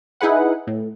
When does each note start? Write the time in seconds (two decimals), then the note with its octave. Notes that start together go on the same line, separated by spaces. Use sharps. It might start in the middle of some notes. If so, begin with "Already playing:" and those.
0.21 D#4 E4 G#4 B4 F#5
0.67 A2